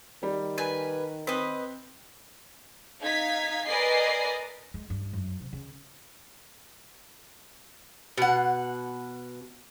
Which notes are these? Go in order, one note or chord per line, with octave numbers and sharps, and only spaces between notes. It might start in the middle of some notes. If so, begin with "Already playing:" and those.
D#3 G3
B4 G#5
C4 B4 D#5
D#4 F5 G#6 B6
A#4 B4 D5 D#5 G#5 C7
G#3
G2
F#2
C3
C#3
B2 F#5